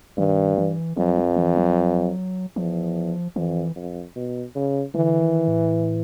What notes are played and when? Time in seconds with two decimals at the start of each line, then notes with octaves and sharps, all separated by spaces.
0.17 G2 D#3
0.57 E3
0.97 F2 F#3
1.18 F3
1.37 E3
1.57 F#3
2.56 E2 F3
3.36 F2 E3
3.76 F2
4.16 B2
4.55 C#3
4.95 D3 E3
5.21 D#3
5.48 A2